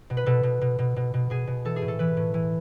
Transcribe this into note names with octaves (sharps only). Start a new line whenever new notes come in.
B2
B4
B2 A4
B2
B2
B2
B2
B2
B2 G#4
B2
E3 A4
G#4
A2
A4
E3 B4
A2
E3